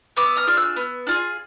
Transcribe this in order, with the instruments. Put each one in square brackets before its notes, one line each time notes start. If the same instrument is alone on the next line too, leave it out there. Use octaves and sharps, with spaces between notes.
[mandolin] B3 D6 E6
D#6 F6
D4 F4 G#4
E6 F#6
B3
D4 F4 G#4